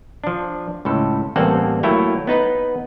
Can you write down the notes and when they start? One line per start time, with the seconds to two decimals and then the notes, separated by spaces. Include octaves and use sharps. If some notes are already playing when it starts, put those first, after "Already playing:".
0.24 F3 D4
0.85 C#2 A2 A4
1.36 A1 G3 A#3 C4 A4 F#5
1.83 F#3 A3 A#3 E4 C#5 G5
2.27 B3 D#4 B4 F#5